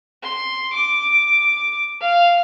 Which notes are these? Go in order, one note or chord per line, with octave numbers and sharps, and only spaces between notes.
C6
D6
F5